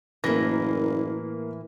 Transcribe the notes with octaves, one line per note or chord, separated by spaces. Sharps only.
F#1 A2 E3 A#3 A#6